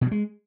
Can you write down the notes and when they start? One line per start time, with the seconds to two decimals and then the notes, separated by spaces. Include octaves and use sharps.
0.01 B2
0.06 F#3
0.12 G#3